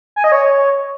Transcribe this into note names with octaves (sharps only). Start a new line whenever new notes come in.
G#5
D#5
C#5